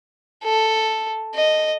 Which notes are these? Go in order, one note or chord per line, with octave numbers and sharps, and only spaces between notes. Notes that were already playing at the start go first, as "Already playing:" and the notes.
A4
D#5